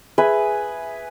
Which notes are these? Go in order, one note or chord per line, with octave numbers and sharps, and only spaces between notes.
G#4 B4 E5